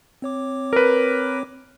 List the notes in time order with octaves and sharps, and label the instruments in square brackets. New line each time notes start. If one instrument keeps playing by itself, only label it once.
[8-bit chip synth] C4 C#5 D6
[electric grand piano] A#4 B4